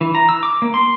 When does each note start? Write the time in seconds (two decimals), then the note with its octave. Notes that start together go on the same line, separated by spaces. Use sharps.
0.01 E3
0.15 A#5
0.29 E6
0.43 D6
0.62 A#3
0.74 C6